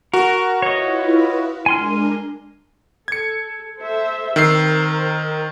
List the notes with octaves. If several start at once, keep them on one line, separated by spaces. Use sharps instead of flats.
F#4 A#4
E4 F4 B4 C#5 D#5
G#3 D4 A#4 G#5 C6 F6
A4 G#6 C#7
A4 C5 E5
D#3 C4 B4 E6 C7
A#4 C5